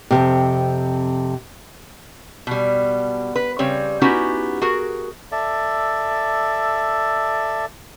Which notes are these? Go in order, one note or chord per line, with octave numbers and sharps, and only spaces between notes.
F2 A2 C3
B2 G3
B4
C#3 G3 C4 C#5
B3 C#4 D#4 E4 F#4 G4
F#4 G#4 A#4
A4 D5 E5